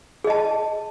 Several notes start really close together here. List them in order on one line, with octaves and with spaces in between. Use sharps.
G#4 D#5 A5